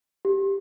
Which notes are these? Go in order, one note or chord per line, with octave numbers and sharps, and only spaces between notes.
G4